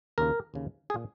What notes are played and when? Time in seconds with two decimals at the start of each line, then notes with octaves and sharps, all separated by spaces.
0.18 D#2 C#3 A#4
0.54 D#2 C#3
0.90 G#4
0.94 A#2